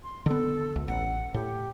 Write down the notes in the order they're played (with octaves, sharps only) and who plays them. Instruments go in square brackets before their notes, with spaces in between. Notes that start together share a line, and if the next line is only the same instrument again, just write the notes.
[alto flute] C6
[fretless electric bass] D3 B3 [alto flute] A4
[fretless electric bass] C#2
[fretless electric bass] A1 [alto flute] F#5
[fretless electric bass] A2 [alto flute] G4